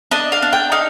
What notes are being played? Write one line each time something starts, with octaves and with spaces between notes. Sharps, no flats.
D4 D#5
F5
D4
G5
D#4 F5